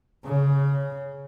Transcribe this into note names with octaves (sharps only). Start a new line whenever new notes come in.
C#3